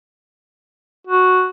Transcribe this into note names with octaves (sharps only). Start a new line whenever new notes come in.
F#4